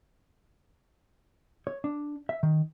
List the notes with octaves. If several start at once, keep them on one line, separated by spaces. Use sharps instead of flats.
C#5
D4
E5
D#3